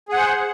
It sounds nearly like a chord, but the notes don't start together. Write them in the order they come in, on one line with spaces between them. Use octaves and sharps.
G#4 F#5 C5